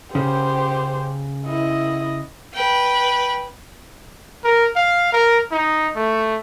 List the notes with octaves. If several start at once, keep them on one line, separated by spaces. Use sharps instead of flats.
C#3 G4 C5
E4 D#5
B4 G5
A#4
F5
A#4
D#4
A3